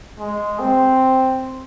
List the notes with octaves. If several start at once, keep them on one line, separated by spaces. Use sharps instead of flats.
G#3
C4